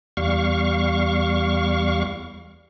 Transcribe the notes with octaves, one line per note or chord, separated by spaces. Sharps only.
E2 G3 F5 C#6